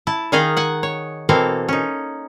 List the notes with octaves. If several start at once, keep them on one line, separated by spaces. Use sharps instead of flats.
E4 A5
D#3 D#4 G#4 D#5 F5 G#5
F#5 G#5
C#5
B2 E3 A#3 C4 A4 F5
C#4 D#4